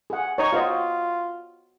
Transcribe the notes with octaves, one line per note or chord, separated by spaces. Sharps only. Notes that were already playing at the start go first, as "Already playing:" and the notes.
G#4 F#5
D#4 C#5
F4 F#4 C5 D#5